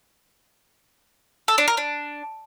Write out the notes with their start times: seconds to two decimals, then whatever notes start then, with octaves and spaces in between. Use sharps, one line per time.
1.48 A4
1.58 D4
1.68 A#4
1.77 D4